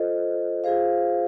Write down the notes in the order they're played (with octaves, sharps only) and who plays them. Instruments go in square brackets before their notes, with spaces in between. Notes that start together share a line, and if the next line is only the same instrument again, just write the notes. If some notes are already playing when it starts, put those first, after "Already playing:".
Already playing: [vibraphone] F4 A4 C5 D#5
F4 G#4 C5 F5